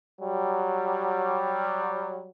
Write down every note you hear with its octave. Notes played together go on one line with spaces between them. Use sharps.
F#3 G3